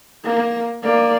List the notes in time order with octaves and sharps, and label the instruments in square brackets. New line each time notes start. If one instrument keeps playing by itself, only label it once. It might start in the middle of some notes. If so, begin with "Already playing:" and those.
[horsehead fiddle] A#3
A#3 D5